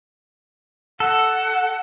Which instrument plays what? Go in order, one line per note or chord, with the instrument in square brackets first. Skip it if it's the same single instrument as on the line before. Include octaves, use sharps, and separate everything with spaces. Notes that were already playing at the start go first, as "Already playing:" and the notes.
[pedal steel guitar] A4 [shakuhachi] F#5